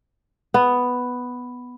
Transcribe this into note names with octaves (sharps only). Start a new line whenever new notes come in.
B3